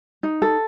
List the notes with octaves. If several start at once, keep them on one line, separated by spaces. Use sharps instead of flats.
D#4
A4